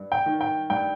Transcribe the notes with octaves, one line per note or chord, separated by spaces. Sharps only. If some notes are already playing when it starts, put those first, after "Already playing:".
Already playing: G2
G5
D#3
G5
G2 G5